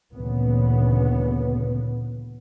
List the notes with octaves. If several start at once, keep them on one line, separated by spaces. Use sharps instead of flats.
D2 A#2 C#3 E3 B3